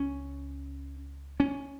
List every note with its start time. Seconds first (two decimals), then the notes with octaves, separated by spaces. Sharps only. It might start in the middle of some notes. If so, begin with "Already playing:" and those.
Already playing: C#2 C#4
1.40 C#4